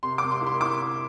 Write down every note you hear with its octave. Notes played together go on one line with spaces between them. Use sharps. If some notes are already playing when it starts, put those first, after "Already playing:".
C3 C6
C3 D6
C6
E4
C6
E4 D6